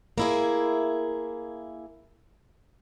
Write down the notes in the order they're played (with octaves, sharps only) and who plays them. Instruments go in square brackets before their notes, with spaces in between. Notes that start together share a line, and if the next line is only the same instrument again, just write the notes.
[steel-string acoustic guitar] A#3 E4 G#4